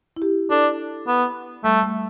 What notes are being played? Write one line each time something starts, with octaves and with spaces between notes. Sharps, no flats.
E4
G4
D4 A4
B3
G3 A3
A3